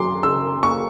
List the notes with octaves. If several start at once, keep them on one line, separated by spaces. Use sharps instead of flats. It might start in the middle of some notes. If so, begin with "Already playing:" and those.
Already playing: F#2 F#3 C6 D6
C#3 E6
A#3 C#6